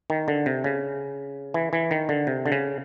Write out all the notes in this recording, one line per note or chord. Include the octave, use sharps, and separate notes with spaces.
D#3
D3
C3
C#3
E3
E3
D#3
D3
C3
D3
C#3